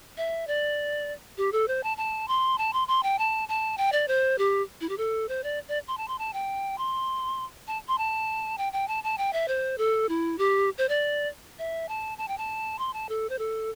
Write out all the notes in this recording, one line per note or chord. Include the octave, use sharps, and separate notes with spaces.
E5
D5
G4
A4
C5
A5
A5
C6
A5
C6
C6
G5
A5
A5
G5
D5
C5
G4
E4
G4
A4
C5
D5
D5
C6
A5
C6
A5
G5
C6
A5
C6
A5
G5
G5
A5
A5
G5
E5
C5
A4
E4
G4
C5
D5
E5
A5
A5
G5
A5
C6
A5
A4
C5
A4